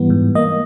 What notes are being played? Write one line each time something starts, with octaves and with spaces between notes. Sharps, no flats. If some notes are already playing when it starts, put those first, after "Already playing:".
Already playing: G#2 E3 G3 B3
G#2
A#3 D#5